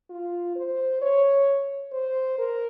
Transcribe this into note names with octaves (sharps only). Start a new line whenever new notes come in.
F4
C5
C#5
C5
A#4